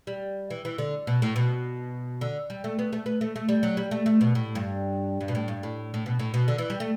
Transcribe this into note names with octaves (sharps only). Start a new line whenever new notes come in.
G3
E3
E3
D3
B2
A2
B2
D3
G3
A3
B3
A3
B3
A3
A3
G3
F#3
G3
A3
A3
B2
A2
G2
G2
B2
A2
G2
A2
A2
B2
A2
B2
D3
E3
G3
A3